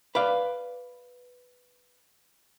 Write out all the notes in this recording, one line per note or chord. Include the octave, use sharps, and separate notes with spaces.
B4 D5 F5